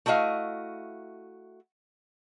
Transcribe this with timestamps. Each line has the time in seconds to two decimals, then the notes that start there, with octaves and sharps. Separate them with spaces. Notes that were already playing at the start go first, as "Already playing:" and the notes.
0.06 A3 E4 F#4 D#5 F5